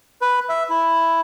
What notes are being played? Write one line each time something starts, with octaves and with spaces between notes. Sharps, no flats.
B4
E5
E4